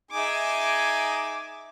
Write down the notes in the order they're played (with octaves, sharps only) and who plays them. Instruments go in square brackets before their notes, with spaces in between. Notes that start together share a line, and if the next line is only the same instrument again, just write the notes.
[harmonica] D#4 G#4 G#5 [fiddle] E5 D6